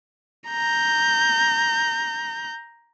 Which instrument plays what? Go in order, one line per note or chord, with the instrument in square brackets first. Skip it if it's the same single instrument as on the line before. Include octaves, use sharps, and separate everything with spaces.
[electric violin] A#5 G6